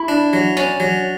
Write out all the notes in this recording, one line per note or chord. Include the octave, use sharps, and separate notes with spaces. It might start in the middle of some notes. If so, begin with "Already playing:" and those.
Already playing: E4
D4
F#3
C#4 D4
F#3